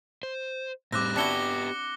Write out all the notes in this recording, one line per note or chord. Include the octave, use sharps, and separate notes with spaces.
C5
A2 G3 C4 D6 F#6 A#6
B3 D4 E4 F#4 G4 D6 C#7 G7